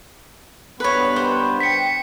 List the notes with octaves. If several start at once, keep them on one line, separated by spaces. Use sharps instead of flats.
G2 B3 B4 C#5
C5
G5 B6 C#7